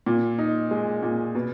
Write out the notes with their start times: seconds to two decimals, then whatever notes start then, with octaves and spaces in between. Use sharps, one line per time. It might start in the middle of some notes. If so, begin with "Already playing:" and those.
0.06 A#2
0.38 D#4
0.71 G#3
1.03 A#2
1.35 B2